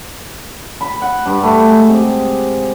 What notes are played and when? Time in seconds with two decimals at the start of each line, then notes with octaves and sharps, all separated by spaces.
0.81 B5
1.02 F#5
1.26 G2
1.43 A3
1.68 G#3
1.89 C3